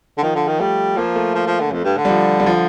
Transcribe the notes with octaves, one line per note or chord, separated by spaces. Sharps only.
D3
D#3 F3
D3
D#3
G3 A3
F3 A#3
A3
F3
F3
D3
F2
G2
D3
G3
F3
G3
F3